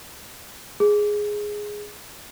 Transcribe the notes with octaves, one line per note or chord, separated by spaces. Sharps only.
G#4